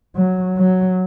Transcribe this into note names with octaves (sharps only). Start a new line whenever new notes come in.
F#3
F#3